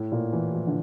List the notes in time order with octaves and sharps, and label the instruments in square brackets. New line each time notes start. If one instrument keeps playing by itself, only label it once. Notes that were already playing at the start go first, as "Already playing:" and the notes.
Already playing: [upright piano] A2
A#2
E3
F3
D3